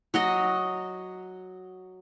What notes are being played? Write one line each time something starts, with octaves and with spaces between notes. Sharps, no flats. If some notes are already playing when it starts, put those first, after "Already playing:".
F#3 F#4 D#5